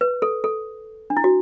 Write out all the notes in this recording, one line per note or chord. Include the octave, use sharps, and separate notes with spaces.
B4
A4
A4
D4
E4
F#4